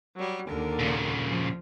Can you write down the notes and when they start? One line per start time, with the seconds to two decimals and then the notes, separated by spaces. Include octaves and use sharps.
0.16 F#3 G3
0.47 D#2 D3 A#4
0.79 A#2 C#3
1.29 F3